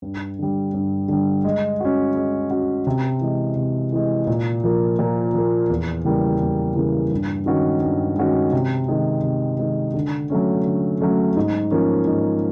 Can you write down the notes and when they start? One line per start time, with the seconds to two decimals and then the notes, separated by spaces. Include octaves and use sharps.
0.02 G2
0.39 D3 G3
0.74 G2
1.08 D3 G3
1.44 G#3
1.80 C#4 F#4
2.15 G#3
2.50 C#4 F#4
2.87 C3
3.21 E3 G#3
3.56 C3
3.92 E3 G#3
4.27 A#2
4.64 F3 A#3
4.99 A#2
5.34 F3 A#3
5.70 E2
6.05 C#3 E3 G3 A#3
6.41 E2
6.75 C#3 E3 G3 A#3
7.11 G2
7.46 D#3 G#3 C#4 F#4
7.82 G2
8.18 D#3 G#3 C#4 F#4
8.52 C3
8.88 D#3 G#3
9.23 C3
9.59 D#3 G#3
9.94 D3
10.30 F#3 A3 C#4
10.65 D3
11.01 F#3 A3 C#4
11.36 G#2
11.71 F3 A#3 C#4
12.06 G#2